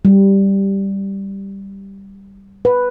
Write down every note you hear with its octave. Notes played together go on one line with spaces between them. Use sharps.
G3
B4